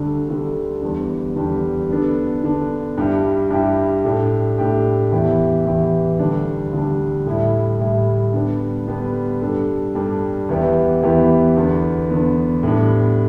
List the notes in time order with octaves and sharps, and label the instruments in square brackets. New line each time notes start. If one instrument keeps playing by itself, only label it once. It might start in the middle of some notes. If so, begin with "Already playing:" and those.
Already playing: [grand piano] D2 D3 G3 D4 A4
D2 D3 G3 D4 A4
E2 D3 G3 D4
E2 D3 G3 D4
D3 B3 D4 A4
D3 B3 D4 A4
G2 G3 E4 G4
G2 G3 E4 G4
A2 A3 D4 G4
A2 A3 D4 G4
E2 E3 B3 E4 G4
E2 E3 B3 E4 G4
D2 D3 G3 D4
D2 D3 G3 D4
A2 G3 E4
A2 G3 E4
D3 G3 B3 D4
D3 G3 B3 D4
G2 G3 D4 A4
G2 G3 D4 A4
E2 E3 B3 E4 G4
E2 E3 B3 E4 G4
E2 D3 B3
E2 D3 B3
A2 G3 B3 D4